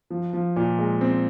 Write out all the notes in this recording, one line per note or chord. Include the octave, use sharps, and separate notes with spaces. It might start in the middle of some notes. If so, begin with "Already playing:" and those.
F3
F3
A#2
G#3
C4